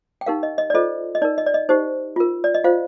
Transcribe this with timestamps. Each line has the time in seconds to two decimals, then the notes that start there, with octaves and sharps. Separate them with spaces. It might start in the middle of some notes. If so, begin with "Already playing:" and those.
0.21 G5
0.26 D#4 G4 A#4 F5
0.43 D#5
0.58 D#5
0.70 D5
0.74 F4 A4 C5 D#5
1.15 D#5
1.22 D#4 A#4 D5
1.38 D#5
1.46 D5
1.54 D#5
1.69 D#4 G4 C5
2.16 F4 A#4
2.44 D5
2.54 D#5
2.64 F4 C5 F5